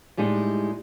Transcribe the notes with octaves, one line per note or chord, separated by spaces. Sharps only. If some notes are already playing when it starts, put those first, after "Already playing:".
A2 G3 G#3 D#4